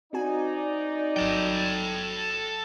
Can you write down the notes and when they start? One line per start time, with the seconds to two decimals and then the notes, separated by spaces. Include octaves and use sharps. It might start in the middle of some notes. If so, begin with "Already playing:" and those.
0.13 C4 D#4 F#4 D5 G#5
1.17 G#1 F#3 A4 G5